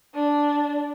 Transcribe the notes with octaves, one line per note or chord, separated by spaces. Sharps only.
D4